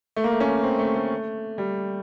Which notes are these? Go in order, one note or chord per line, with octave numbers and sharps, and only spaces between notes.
A3
A#3
A3
C#4
C4
A3
A3
G3